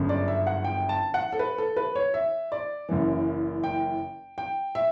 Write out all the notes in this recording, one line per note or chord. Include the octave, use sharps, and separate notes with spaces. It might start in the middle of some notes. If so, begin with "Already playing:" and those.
Already playing: G1 F#2 C#3
D5
E5
F#5
G5
A5
F#5
A4
B4
A4
B4
C#5
E5
D5
F#1 F#2 E3
G5
G5
E5